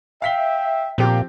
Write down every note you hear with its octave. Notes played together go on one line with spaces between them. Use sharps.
E5 F5 G5 B6 G7
A#2 F3 C4 G4